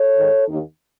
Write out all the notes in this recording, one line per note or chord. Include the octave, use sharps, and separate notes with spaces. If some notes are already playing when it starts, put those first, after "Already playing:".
Already playing: A4 C#5
G#2 D#3
D#2 D#3